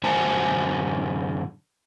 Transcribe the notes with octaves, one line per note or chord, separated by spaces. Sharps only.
F#2 D3 C5 F#5 G#5 A5